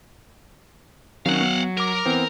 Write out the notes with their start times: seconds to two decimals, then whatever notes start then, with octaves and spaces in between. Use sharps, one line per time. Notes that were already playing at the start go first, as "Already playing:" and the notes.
1.26 D#3 F#3 C4 C#4 F5 F#5
1.41 B3 C#7
1.77 A#4 A#5 D6
2.05 E3 B3 C4